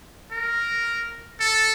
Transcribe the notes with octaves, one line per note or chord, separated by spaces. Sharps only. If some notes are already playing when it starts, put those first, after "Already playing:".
A#4
A4